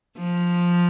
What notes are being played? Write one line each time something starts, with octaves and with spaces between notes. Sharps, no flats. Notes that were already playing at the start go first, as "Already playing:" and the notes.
F3